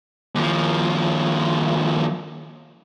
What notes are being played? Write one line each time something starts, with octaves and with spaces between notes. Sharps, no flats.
D#2 F3